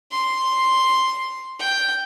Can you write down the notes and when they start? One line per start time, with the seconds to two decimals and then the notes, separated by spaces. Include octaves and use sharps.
0.11 C6
1.59 G5